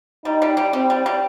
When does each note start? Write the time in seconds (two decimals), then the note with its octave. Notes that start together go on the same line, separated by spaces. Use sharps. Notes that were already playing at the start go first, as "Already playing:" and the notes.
0.25 G3 D#4
0.42 G3
0.57 G3
0.73 G3 C4
0.90 G3
1.06 G3